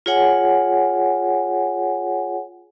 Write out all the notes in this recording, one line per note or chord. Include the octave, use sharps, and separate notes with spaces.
F4 G#4 C#5 F#5 G#5